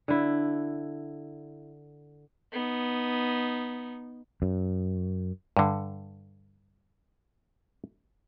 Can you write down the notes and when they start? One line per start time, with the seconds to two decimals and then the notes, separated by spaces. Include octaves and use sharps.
0.08 D3 E4
2.52 B3 D#4
4.42 F#2
5.57 G2 D3